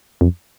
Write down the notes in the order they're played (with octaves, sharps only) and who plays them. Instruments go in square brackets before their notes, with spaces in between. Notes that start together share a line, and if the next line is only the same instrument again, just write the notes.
[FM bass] F2